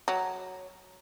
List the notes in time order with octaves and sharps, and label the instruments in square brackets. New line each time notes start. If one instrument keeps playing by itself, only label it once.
[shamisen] F#3